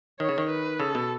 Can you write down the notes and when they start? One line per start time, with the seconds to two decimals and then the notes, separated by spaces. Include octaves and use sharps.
0.20 D#3 C#5
0.29 C#3
0.38 D#3
0.50 B4
0.79 C#3 A4
0.95 B2